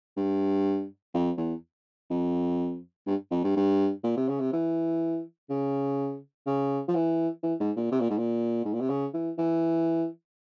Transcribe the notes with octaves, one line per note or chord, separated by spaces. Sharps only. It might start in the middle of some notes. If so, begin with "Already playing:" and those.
G2
F2
E2
F2
G2
F2
G2
G2
A#2
C3
C#3
C3
E3
C#3
C#3
F3
E3
E3
G#2
A#2
C3
A#2
G#2
A#2
G#2
A#2
C3
C#3
E3
E3